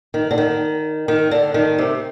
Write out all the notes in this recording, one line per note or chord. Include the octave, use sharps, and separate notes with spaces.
D#3
D3
D#3
D#3
D3
D#3
C3